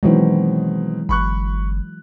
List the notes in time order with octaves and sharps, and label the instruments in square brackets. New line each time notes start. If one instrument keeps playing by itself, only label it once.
[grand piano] B2 D#3 C4 [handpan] E3 F#3 G#3
[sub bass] G1 [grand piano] B5 C#6 F#6